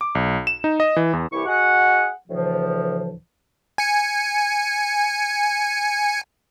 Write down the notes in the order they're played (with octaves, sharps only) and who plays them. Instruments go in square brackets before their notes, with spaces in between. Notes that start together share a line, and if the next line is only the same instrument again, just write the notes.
[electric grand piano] D6
B1
E7
D#4
D#5
E3
E2
[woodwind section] C2 E3 E4 G4 C#6
F#4 G#4 D#5 F#5
D2 A2 C#3 E3 F3
[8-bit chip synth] G#5 C#7